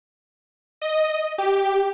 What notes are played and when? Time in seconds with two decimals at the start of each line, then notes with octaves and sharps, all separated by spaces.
0.82 D#5
1.38 G4